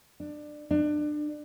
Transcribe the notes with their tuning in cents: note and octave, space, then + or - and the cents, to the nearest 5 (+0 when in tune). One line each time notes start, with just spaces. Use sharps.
D4 +20
D4 +25